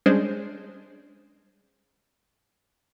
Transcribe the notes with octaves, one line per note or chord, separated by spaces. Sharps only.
G3 G#3 C#4 D4 G#4 C5